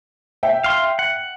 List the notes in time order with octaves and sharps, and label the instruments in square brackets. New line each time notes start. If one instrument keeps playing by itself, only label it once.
[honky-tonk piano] E5 G5
[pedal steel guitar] F5 C6
F#5